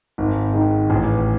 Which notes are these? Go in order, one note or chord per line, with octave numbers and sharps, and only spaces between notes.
G#1
G#2 D#3
A1